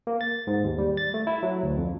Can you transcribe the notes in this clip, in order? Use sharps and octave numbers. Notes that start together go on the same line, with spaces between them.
A#3
A6
G#2
D#2
G3
A6
A3
E4
F#3
D2
F2